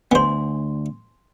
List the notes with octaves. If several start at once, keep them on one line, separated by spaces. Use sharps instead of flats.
D2 B3 C5 G#5 C6